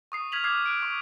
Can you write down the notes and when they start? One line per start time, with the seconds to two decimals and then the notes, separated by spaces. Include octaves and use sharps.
0.12 C#6 D#6 C7
0.32 F6 G#6 B6 F7 F#7
0.44 D6 D#6 F6 F#6 G#6 C7
0.66 F#6 D7
0.82 C#6